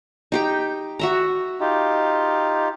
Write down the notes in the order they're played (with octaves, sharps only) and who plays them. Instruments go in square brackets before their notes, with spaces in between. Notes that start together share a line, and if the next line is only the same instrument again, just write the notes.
[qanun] D#4 G4 G5
F#4 E5 A#5
[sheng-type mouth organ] D#4 F4 G4